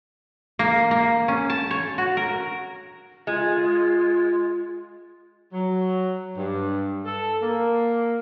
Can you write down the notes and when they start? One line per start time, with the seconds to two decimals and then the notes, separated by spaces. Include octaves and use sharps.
0.59 A#3
0.91 A#3
1.28 C#4
1.50 A5
1.71 C#5
1.98 F#4
2.17 A#4
3.27 G#3 F4
5.52 F#3
6.37 G2
7.05 A4
7.42 A#3